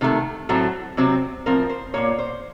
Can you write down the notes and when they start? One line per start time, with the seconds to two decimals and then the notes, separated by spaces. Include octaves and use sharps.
0.01 C3 D#3 A3
0.49 A2 F#3 A3 C4
0.97 C3 F#3 C4
1.46 A2 F3 C4 A#4
1.69 C5
1.94 A#2 F3 A#3 C#5
2.18 C5